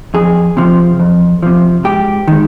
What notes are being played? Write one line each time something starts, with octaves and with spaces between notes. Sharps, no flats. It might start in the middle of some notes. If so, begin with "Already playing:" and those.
F2 G#4
C3 F3
F2
C3 F3
G#2 G4
D#3 G#3